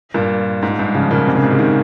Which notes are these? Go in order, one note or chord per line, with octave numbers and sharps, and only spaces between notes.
G2 A#2
G#2
G2
C#3 F3
A#2 C#3
G#2 C3
A#2 C#3
G#2 C3
A#2 C#3
C3 D#3